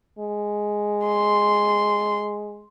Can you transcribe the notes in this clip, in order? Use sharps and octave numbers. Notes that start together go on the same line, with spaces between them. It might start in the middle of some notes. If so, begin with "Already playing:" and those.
G#3
C6